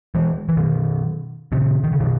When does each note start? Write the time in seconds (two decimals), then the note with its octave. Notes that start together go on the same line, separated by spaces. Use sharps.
0.15 E3 G#3
0.49 E3
0.57 B2 D#3
1.52 A#2 C#3
1.84 D#3
1.92 C#3
2.00 B2 D#3